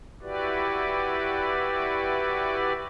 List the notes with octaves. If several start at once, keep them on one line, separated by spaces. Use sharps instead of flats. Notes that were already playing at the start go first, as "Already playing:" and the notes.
E4 F#4 G4 B4 D5